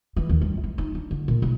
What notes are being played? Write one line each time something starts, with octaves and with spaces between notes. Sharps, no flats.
E3
D#2
G2
E4
D#4
D4
D3
A#2
B1